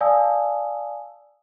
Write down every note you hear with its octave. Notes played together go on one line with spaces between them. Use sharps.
D5 F5 G#5 A5 D#6 E6